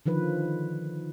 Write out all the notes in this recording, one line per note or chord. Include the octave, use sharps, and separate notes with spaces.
D3 D#3 F3 B4